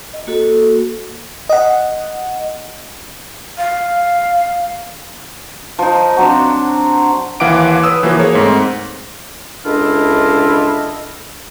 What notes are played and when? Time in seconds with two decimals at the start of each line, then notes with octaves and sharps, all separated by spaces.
0.14 D#5
0.27 A#3 F#4 A4
1.49 D#5 F#5
3.58 F5
5.79 F3 D#4
6.16 F#3 C4 D4
7.40 D#2 E3 F5 F#5 D6 D7
7.83 B4 C#5 D#6 E6
8.03 E3 F3 A#3 F#4
8.19 A#3 G#4 C#5
8.35 G#2 A3 C4
9.66 C#2 D3 D4 E4 F4 D#5